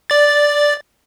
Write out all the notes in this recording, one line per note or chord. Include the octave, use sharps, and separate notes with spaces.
D5 A6